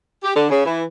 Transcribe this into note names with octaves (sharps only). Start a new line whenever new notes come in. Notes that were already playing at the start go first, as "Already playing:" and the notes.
G4
D3
C#3
E3